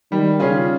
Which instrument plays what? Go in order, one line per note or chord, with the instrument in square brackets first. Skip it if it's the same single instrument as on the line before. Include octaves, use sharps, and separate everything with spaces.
[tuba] D#3 [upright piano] G3
[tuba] C#3 [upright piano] C#4 F4 G#4